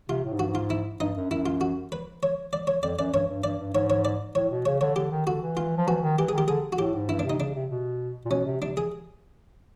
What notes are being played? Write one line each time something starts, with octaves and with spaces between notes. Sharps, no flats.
C3 F4
A2
G#2
G2 F#4
G#2
F4
E4
G2 D#4
F#2
F#2 E4
F4
F#4
B4
C#5
D5
C#5
F2 D5
F#2 D5
G2 C#5
G2
G2 D5
G2
G#2 C#5
C#5
D5
A2 C#5
B2
C#3 C#5
D3 C#5
D3 G4
D#3
D3 F#4
E3
F4
F3
E3 F#4
D#3
E3 G4
D#3 G#4
G4
D3 G#4
F#4
A2 G4
G#2
G2 E4
D4
C3
D#4
C#3 D4
C3
B2
A#2
B2 C#4
C3
C3 D4
G#4